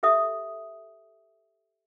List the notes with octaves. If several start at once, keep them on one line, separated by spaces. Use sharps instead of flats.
G4 A4 E5 D#6